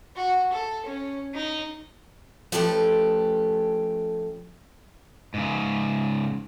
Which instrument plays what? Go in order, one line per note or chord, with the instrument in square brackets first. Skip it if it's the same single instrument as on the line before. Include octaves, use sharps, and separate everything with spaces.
[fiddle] F#4
A4
C#4
D#4
[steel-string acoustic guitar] F3 A3 C#4 G4 A4 B4
[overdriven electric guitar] G#2 C#3